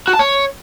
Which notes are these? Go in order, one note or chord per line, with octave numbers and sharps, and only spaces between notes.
F#4
A5
C#5